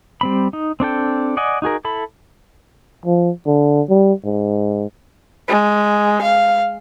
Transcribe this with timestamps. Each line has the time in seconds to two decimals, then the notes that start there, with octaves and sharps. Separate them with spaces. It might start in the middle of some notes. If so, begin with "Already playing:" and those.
0.21 G3 C4 B5
0.53 D#4
0.80 C4 D4 A4 G5
1.37 D5 D#5 F#5 G#5
1.62 D#4 F#4 G#4 A#4
1.85 E4 A4 B5
3.06 F3
3.46 D3
3.89 G3
4.24 G#2
5.48 G#3
6.22 F5